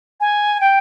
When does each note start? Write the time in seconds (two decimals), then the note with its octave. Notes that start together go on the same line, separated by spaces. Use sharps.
0.20 G#5
0.61 G5